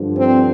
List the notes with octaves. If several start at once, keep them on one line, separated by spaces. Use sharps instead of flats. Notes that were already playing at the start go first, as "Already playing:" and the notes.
Already playing: G2 D3 F3
C4